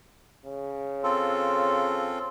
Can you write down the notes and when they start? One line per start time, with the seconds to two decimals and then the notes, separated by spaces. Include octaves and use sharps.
0.45 C#3
1.03 C4 F4 A4